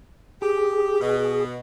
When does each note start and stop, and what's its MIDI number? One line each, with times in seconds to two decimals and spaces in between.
0.42 1.00 67
0.42 1.45 68
1.01 1.59 47